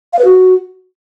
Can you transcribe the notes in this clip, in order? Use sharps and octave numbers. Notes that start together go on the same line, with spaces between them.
F5
B4
F#4